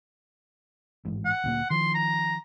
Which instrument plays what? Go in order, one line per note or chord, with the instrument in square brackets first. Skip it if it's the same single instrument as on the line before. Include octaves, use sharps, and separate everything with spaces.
[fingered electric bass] A1 G#2
[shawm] F#5
[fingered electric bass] D2 A#2 A#3
[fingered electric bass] D#3 F3 [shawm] C6
[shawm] A#5